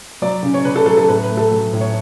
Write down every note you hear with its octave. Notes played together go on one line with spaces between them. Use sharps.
F#3 D5
C#3
C#5
C#3 B4
A4
F#3 A4
A4
A2 B4
B4
A3
A4
F#3
A2
C#5